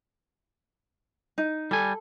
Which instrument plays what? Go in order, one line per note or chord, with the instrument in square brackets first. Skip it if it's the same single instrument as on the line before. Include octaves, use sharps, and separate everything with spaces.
[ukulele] D#4
[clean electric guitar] G3 G#5 [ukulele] A4